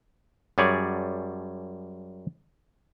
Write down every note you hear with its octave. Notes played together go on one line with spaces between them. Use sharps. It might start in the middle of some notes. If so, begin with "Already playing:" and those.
F#2 G3 G#4 C#5 D5